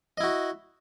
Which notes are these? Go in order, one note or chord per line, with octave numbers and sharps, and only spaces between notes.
E4 F#4 D#5